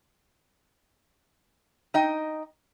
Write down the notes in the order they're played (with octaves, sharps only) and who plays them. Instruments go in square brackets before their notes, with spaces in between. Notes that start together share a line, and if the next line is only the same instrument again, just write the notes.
[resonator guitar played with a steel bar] D#4 D#5 G5